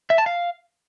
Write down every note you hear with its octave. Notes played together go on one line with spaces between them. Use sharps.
E5
A5
F5